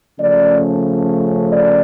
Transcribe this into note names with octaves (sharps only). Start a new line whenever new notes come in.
C#3 F3 A3 C#4 D5
D5